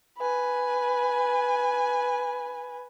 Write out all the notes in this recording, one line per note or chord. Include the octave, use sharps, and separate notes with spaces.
B4 G#5